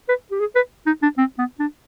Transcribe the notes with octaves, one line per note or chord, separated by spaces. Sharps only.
B4
G4
G#4
B4
D#4
D4
C4
B3
D4